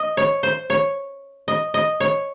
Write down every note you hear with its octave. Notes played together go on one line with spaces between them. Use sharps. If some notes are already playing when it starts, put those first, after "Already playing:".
Already playing: D#5
C#5
C5
C#5
D#5
D#5
C#5